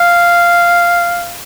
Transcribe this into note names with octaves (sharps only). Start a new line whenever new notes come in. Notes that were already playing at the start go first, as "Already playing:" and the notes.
Already playing: F5